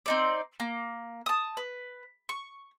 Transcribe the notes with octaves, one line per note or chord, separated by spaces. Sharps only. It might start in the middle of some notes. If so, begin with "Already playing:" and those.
C4 D#4 D5
A#3
A5 D#6
B4
C#6